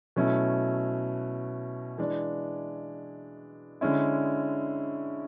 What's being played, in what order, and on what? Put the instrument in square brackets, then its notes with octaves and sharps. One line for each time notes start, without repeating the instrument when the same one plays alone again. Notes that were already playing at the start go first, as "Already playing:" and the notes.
[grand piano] B2 F#3 A3 C#4 E4
E3 G#3 D4
D3 G#3 C#4 E4